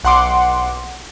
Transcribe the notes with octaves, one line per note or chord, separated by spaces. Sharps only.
B1 F#5 C6 D6